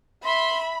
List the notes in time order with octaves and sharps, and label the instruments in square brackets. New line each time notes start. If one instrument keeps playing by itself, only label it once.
[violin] E5 [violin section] B5 [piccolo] C6